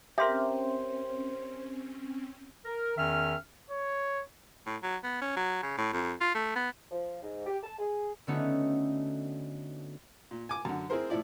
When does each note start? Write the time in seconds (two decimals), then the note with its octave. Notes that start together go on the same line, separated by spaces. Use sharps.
0.18 C4 C#4 G4 A#4 C5 E5 C6
2.65 A#4
2.97 E2 D#3 C#4 E5 F6
3.70 C#5
4.66 A2
4.83 F#3
5.03 B3
5.21 C#4
5.37 F#3
5.62 C#3
5.78 A2
5.93 F2
6.21 F4
6.35 A3
6.56 B3
6.91 F3
7.23 G#2
7.46 G4
7.63 A5
7.79 G#4
8.27 D3 A3 B3 C#4 D#4 F#4
10.31 A#2
10.49 G#5 D6
10.65 F#2 D3
10.90 C4 E4 G#4 A#4 C5
11.10 A2 F3 E4 D5